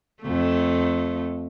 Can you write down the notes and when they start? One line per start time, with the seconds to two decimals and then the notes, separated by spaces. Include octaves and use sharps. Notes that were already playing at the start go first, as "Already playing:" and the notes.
0.23 F2 A3